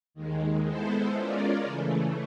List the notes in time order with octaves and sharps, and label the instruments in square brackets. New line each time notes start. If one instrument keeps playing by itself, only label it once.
[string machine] D#2 D#3 G#3
G#3 B3 E4 A4 C5
G#3 C#4 F4 A#4 D5
C#3 E3 A3